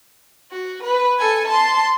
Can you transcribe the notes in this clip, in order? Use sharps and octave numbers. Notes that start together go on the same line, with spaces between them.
F#4
B4
A4 G#5
A5 C6